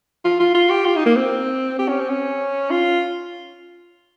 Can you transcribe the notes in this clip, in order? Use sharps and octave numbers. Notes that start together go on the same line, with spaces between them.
F4
F4
F4
G4
F4
D#4
A#3
C4
G4
C#4
C4
C#4
F4